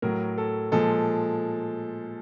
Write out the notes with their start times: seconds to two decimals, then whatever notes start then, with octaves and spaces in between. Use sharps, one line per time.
0.02 A2 F#3 A#4
0.38 A4
0.72 A#2 F3 G#3 A4